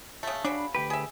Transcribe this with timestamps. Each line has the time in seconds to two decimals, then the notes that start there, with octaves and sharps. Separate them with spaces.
0.23 C#3 A3
0.45 C#3 F#3 D4 B5
0.75 D2 G4 B4
0.90 G#4 E5